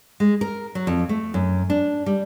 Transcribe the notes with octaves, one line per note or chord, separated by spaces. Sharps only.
G#3
A#4
F#3
F2
A3
F#2
D4
G3